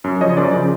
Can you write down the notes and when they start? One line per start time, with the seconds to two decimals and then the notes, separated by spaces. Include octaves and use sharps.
0.04 F#2
0.21 C#3 F3 C#5 D#5
0.37 F#2 C5 D5
0.53 C#3 F3